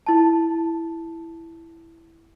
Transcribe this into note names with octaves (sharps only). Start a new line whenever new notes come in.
E4 A5